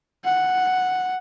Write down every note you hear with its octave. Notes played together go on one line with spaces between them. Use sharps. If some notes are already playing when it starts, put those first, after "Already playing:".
F#5